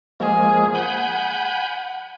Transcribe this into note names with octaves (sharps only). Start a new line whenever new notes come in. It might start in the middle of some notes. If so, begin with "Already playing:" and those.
F3 G#3 A#3 G#4
F#5 G#5 B5 G6